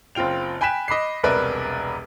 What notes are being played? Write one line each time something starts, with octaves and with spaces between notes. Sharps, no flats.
F#1 C4 F4 G5 F7
G5 G#5 B5 F#6 B6 E7
D#5 B5 D6 C7
E1 C2 A#4 B4 D5 E5